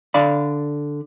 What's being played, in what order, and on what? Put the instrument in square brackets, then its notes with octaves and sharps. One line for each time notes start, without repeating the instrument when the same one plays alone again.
[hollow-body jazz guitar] D3 D5 F5 B5